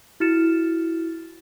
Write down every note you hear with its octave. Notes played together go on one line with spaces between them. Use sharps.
E4 F#4 F6 A6 C#7 E7